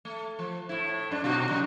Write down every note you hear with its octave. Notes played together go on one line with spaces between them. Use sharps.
A3
F3
A2 E4
F#2 D4
B2 D#4 F#4
C#3 F#3 D#4